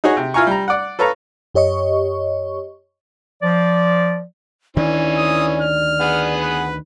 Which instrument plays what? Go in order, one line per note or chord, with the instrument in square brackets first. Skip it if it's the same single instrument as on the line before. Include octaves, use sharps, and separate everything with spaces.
[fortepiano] D#4 F#4 G#4 C#5
C3
E4 F4 F5 G#5 A#5 C#6
G3 A#5
D5 F#5
A4 B4 C#5 F5 A#5
[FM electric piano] F#2 G4 C#5 D#5 C#6
[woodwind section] F3 D5
[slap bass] D2 D#3 D4 [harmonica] E3 C#4 [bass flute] D5
[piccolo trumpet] D#6
F6
[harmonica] B3 G#4 F#5
[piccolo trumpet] B4